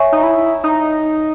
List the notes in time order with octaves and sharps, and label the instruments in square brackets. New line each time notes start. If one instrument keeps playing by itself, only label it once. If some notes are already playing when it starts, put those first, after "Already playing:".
Already playing: [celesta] C#5 E5 G#5 C#6
[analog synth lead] D#4
E4
D#4